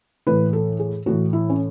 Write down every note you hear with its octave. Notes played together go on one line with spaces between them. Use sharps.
A2 E3 B4
A4
G#4
A2 E3 F#4
E4
C#4